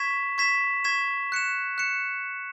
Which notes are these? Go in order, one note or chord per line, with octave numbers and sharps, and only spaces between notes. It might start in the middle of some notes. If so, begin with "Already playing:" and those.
Already playing: C#6 G#6 B6 E7
C#6 G#6 B6 E7
C#6 G#6 B6 E7
F#6 C#7 E7
F#6 C#7 E7